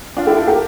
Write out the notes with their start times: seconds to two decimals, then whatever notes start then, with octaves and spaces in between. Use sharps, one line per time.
0.17 D4 F4
0.27 E4 G4
0.37 F4 A4
0.47 G4 A#4